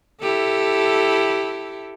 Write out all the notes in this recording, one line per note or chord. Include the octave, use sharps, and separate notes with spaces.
E4 G4 A4